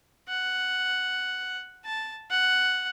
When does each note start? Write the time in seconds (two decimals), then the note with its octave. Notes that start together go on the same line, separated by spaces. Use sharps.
0.29 F#5
1.84 A5
2.30 F#5